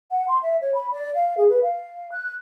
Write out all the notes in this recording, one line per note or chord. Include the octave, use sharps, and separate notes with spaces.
F#5
C6
E5
C#5
B5
D5
F5
G#4
B4
F5
F#6